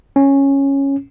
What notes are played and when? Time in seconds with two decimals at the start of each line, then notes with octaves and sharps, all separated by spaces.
0.16 C#4